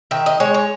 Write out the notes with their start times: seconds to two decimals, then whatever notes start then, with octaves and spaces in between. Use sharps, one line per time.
0.11 D#3 E5
0.26 D#5
0.40 G#3 C#5
0.54 C#5